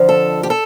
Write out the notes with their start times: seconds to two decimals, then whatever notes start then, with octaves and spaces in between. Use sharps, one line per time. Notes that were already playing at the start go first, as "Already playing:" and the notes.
Already playing: F2 D3 F3
0.09 A4
0.43 G4
0.50 A4